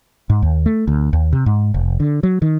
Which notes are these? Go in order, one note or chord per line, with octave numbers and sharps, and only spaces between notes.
G#2
D#2
A3
D2
D#2
C3
G#2
F1
D3
F#3
D#3